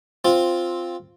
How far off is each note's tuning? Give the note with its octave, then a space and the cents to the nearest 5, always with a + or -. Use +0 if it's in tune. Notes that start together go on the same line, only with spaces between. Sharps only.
C4 +0 F4 +5